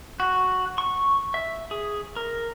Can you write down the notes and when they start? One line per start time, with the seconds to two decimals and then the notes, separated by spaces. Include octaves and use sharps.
0.20 F#4
0.78 C#6
1.34 E5
1.71 G#4
2.16 A#4